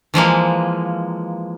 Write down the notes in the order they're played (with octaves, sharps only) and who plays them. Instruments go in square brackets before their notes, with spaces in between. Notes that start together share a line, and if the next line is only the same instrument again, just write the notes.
[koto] E3 F3 G#3 A#3